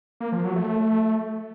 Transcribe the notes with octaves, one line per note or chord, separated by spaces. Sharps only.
A#3
F3
F#3
A3